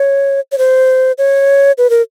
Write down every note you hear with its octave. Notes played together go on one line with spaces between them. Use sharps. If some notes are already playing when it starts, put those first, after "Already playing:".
Already playing: C#5
C#5
C5
C#5
B4
A#4